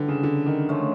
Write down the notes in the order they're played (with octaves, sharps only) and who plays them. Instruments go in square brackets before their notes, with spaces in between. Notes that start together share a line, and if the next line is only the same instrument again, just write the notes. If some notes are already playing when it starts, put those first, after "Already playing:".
Already playing: [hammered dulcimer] A2 E3 G3 [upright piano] D3
[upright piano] C#3
D3
D#3
[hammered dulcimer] F3 A3 C#4